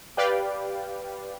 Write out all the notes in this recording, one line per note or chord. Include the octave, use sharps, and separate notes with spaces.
G4 B4 D5 F5 G5